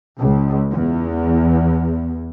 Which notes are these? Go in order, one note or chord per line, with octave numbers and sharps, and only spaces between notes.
C#2
E2